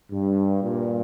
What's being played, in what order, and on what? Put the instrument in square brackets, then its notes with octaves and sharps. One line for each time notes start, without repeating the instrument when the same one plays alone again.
[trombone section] G2
G2 A#2